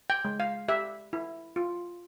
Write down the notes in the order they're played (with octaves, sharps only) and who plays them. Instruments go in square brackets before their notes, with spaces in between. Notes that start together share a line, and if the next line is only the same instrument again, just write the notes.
[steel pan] G5
G#3
F5
G4 E5
E4
F4